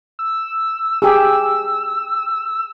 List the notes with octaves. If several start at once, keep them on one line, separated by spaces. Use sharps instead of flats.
E6
G4 G#4 E6